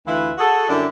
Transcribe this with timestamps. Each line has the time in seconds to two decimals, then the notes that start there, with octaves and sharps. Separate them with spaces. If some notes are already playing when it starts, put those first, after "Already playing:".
0.07 D2 E3 E4 F4 B4 E5
0.38 F#4 G#4 A4
0.69 F#2 D3 G3 D4 E4